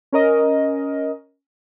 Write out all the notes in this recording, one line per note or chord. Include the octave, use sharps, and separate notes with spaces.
C#4 A#4 D#5